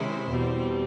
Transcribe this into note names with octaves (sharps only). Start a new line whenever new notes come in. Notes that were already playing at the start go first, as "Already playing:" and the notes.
Already playing: C3 D#3 G#3 C#4 E4 C5
E2 B2 G3 C4